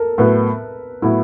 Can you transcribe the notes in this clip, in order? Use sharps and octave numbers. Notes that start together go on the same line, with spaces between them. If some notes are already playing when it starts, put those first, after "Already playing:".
Already playing: A4 A#4
A2 F#3 B3 B4
A2 F#3 B3 E4